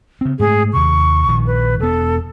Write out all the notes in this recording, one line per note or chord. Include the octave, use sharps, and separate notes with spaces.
C#3 C4
G#2 A3 G#4
D#2 C3 C#6
A#1 D#3
B4
E1 B3 A4